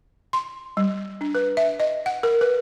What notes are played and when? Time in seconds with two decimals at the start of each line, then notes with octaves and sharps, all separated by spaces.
0.33 C6
0.77 G3
1.21 D4
1.35 B4
1.57 E5
1.80 D#5
2.06 F#5
2.23 A#4
2.41 B4